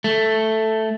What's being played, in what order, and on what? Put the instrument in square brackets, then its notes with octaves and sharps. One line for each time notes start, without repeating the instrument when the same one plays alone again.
[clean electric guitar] A3